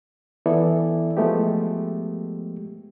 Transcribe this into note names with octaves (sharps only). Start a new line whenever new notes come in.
E3 B3 E4 A4 D5 E5
F3 G#3 A3 B3 G4